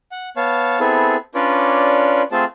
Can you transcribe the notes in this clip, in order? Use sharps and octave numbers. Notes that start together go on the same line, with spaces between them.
F#5
B3 C#5 F5 A5
B3 C4 E4 G#4 A4
C#4 D4 F4 B4 C#5 D5
A3 C4 F4 G#4 A4 A5